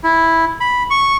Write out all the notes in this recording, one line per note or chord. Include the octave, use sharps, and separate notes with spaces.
E4
B5
C#6